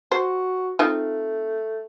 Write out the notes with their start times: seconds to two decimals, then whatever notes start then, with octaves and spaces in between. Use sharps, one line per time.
0.12 F#4 C5
0.79 A3 C4 D#4 F4